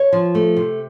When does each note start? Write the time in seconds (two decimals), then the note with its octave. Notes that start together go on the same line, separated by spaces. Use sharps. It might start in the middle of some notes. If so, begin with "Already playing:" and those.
Already playing: C#5
0.13 F3
0.35 A3
0.57 C3